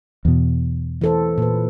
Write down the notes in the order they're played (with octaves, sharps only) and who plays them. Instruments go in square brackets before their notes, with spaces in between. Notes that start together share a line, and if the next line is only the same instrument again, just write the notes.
[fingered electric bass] E2 B2
[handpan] E3 A4 C5
A#2 B4